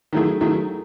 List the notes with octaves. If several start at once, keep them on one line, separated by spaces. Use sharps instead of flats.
D#3 F#3 A3 E4 G#4
D#3 F#3 A3 E4 G#4